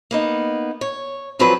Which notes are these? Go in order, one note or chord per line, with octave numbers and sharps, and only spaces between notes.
A#3 B3 D#4
C#5
D3 F3 F#3 C4 F4 B4